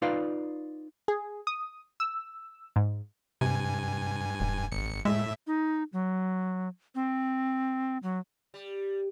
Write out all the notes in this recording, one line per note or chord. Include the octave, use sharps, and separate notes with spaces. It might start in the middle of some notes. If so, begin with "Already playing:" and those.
D#4 F4 B4 D5 F5
G#4
D#6
E6
G#2
G2 C3 G#5
E1
G#1 C#7
A2 G#3 E5
D#4
F#3
C4
F#3
G3